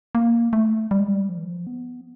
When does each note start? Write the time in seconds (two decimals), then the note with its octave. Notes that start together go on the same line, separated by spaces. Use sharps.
0.15 A#3
0.53 A3
0.91 G3
1.00 G#3
1.08 G3
1.29 F3
1.37 E3
1.44 F3
1.67 B3